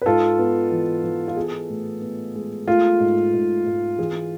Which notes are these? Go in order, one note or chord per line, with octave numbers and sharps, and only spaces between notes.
B4
G#2 F4 A4
B3
E3
E3
F4
B3 G#4
A2
B3
G#3
A3 F4
G#2
G#2
G#2
E3 G#4